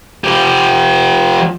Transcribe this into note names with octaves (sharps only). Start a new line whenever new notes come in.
F3 G4